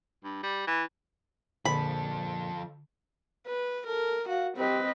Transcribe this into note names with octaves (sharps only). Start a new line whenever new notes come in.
G2
G3
E3
A#1 D3 F3 A4 B5
B4
A4 A#4
F#4 F5
C4 G4 B4 D#5